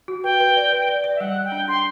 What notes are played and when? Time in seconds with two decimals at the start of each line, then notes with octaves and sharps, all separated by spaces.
0.08 F#4
0.24 B4 G5
0.40 B4
0.57 D5
0.72 B4
0.88 D5
1.04 D5
1.15 E5
1.20 G3 F#5
1.36 G3
1.45 G5
1.52 D4
1.68 D4 C6